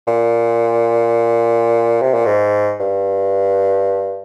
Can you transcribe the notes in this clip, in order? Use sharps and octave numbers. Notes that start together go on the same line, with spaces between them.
A#2
C3
A#2
G#2
G2